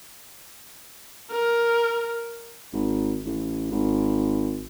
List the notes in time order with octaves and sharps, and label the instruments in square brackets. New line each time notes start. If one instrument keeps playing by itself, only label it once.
[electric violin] A#4
[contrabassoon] G#1
A1
G#1